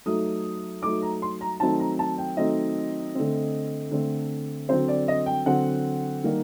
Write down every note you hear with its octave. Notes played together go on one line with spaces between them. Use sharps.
F#3 A3 D#4 D#6
F#3 A3 D#4 D6
A#5
C6
A#5
D#3 F#3 A3 C4 D#4 A5
A#5
A5
G5
D#3 F#3 A3 C4 D#4 D#5
D3 A3 C4
D3 A3 C4
D3 F#3 C4 C5
D5
D#5
G5
D3 F#3 C4 F#5
D#3 G3 A#3 D#4